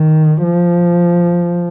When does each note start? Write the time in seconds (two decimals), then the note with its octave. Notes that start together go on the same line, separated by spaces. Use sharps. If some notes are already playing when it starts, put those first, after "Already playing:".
Already playing: D#3
0.43 F3